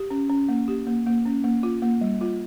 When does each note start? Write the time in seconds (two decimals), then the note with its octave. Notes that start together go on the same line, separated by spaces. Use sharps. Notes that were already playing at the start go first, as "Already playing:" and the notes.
Already playing: G4
0.11 C#4
0.30 C#4
0.49 A#3
0.68 G4
0.87 A#3
1.06 A#3
1.25 C#4
1.44 A#3
1.63 F4
1.82 A#3
2.01 G3
2.21 F4